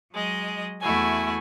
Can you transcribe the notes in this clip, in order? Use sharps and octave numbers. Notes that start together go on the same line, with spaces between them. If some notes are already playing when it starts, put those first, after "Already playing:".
F#3 G#3 D#5
E2 A3 E4 F#4 G#5